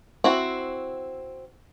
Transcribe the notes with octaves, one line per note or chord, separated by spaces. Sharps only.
C4 E4 F#4